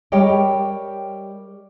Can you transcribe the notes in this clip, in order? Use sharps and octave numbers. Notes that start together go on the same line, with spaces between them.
G3 G4 A#4 C#5 D#5 G5